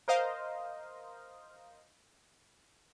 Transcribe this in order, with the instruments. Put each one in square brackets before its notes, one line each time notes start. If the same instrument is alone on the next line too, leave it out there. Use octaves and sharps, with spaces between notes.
[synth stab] A#4 C5 D#5 F5